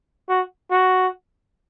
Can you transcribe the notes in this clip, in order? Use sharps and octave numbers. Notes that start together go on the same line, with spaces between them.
F#4
F#4